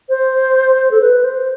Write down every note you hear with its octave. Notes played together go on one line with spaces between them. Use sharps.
C5
A4
B4
C5